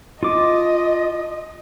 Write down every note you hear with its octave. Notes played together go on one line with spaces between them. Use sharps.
F4 D#5 D6